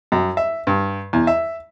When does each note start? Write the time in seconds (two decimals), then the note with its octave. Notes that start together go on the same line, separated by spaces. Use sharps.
0.12 F#2
0.37 E5
0.67 G2
1.13 E2
1.27 E5